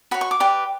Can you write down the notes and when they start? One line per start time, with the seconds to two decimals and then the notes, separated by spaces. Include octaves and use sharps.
0.11 F#4 C#5 B5
0.21 C#6
0.31 D6
0.40 G4 B4 D5